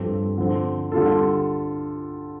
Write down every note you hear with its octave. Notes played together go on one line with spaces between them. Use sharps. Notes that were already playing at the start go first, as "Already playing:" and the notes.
Already playing: G2 F3 C4 A4
D3 F3 C4
D3 G3 F4 A4